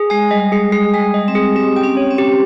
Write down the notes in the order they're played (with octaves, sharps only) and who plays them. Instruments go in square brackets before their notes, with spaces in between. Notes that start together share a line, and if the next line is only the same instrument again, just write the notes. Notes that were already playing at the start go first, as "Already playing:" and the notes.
Already playing: [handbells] G#4
[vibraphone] G#3 [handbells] G#5
[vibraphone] G3 [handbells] D#5
[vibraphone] G#3 [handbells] G#4
[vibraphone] G#3 [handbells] G#4
[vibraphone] G3 [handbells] G#5
[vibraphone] G#3
[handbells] D#5
[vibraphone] C4
[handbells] G#4
[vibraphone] C4 [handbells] G4
[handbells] G5
[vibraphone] C#4
[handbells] C#5
[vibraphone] C4
[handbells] G4